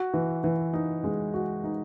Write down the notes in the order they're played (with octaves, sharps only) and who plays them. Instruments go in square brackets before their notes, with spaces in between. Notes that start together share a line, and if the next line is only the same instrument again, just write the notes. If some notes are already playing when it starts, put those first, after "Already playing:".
Already playing: [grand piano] F#4
E3
E3
D#4
G#3
F#4
D#4